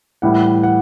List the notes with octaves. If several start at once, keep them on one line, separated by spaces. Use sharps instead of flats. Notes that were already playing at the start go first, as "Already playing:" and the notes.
A2 E3 G3 F#5
F#5